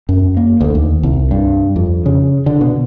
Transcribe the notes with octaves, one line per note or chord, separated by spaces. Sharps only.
F#2
A#3
D2
D#2
C2
G2
F2
C#3
D3
B2